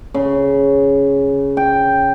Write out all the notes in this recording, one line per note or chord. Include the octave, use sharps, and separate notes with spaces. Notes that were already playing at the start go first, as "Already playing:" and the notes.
C#3
G5